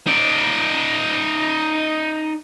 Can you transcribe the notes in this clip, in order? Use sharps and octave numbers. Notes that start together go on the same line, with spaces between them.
D#4 D5